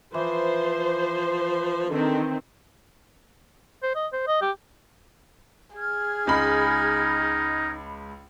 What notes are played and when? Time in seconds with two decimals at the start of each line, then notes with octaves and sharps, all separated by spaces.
0.14 E3 F3 C5
1.89 D3 D#3 C4
3.83 C5
3.96 D#5
4.13 C5
4.28 D#5
4.42 G4
5.76 G#4 F6 G#6
6.27 C#2 G#3 D#4 B5